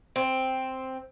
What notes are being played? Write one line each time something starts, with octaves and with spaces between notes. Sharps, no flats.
C4